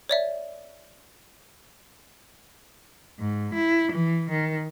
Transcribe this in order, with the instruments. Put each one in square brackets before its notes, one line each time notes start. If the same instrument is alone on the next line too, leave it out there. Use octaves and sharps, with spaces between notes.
[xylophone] C#5 D5 E5
[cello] G#2
E4
E3
D#3